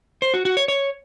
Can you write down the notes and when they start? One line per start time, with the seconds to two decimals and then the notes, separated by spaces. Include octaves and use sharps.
0.22 C5
0.34 F#4
0.45 F#4
0.57 C#5
0.68 C#5